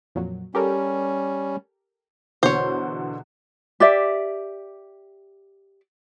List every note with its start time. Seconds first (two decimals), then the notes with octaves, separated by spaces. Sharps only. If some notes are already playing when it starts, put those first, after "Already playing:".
0.15 F2 A#2 F#3
0.55 G3 C#4 G4 A4 A#4
2.43 E2 B2 D3 C5 C#5
3.80 G4 D5 E5